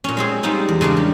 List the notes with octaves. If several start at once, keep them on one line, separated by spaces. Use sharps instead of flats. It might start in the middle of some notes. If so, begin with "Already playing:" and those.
A#2 C#4
G#3 C4 G#4
G3 G#3 C4 D#4 F4
E2
C#3 G#3 A#3 D4
G3